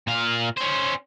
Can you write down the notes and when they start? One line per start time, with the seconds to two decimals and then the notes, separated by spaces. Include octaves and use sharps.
0.07 A#2 F5
0.57 C#4 C5